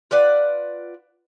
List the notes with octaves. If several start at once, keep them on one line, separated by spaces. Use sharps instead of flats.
F4 B4 D5 F#5